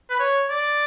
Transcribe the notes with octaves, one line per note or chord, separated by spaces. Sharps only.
B4
C#5
D5